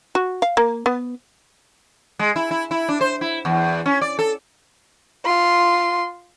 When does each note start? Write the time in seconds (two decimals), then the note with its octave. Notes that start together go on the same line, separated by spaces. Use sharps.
0.15 F#4
0.42 F5
0.57 A#3
0.86 B3
2.19 G#3
2.36 E4
2.51 E4
2.71 E4
2.89 D4
3.01 C5
3.21 E4
3.45 E2
3.86 C#4
4.01 D5
4.19 A4
5.26 F4 C6